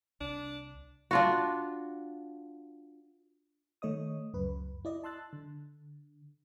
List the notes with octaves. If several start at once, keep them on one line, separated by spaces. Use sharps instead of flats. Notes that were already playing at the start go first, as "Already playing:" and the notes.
C2 D4
D4 F4 F#4
D#3 A3 C#5 D#5 D#6
C#2 F#2 B4
E4 D5 D#5
A5 C6 E6 F#6 A6
D3